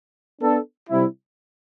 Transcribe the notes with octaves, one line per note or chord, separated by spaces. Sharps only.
B3 D4 A4
C3 G3 C4 E4